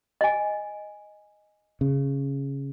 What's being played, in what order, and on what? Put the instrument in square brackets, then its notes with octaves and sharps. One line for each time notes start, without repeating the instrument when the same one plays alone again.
[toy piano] D#5 G#5
[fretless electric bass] C#3